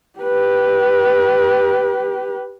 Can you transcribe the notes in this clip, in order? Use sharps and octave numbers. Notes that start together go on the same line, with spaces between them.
G4 B4